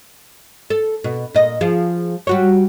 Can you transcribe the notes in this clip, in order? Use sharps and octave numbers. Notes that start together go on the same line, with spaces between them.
A4
B2
A#2 D#5
F3 G#4
G3 F#4 C#5